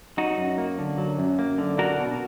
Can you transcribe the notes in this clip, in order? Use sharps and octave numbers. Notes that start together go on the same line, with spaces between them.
F#3 D#4 F#4
F#2
A#3
D3
F#3
F#2
A#3
D3
D4 F#4 A#4
B2